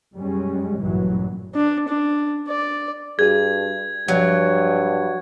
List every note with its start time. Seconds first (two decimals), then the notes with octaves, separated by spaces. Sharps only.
0.15 F#2 G3 G#3 C#4
0.80 A1 G2 A#2 E3 F#3
1.54 D4
1.88 D4
2.48 D5
3.19 G2 F#4 G#4 G#6
4.08 G2 F3 F#3